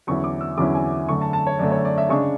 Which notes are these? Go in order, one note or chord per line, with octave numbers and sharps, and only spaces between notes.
E2 D3 F#3 C#4 E4 C#6
D6
E6
E2 D3 F#3 C#4 E4 D6
G#5
F#2 D3 A3 C#6
A5
A5
C#5
F#2 D3 A3 D5
C#5
D5
E5
C#3 G#3 D4 C#6